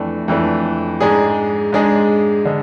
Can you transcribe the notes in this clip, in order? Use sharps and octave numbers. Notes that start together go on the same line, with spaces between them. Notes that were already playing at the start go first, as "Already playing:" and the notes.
Already playing: F2 E3 A3 D4
F2 E3 A3 D4
G#2 G#3 D4 G#4
G#2 G#3 D4 G#4
D3 G#3